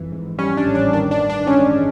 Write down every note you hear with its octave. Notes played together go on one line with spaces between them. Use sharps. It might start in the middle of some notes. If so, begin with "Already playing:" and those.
Already playing: F2 E3
G#2
G3 C#4
D4
A1
D4
D#3 D4
D4
G2
D4
G#3 C#4